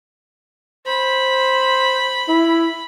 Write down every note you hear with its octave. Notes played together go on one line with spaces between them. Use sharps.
C5 B5
E4